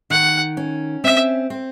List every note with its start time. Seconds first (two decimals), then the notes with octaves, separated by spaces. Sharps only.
0.10 D#3 F#5
0.57 C#4
1.04 C4 E5
1.50 C4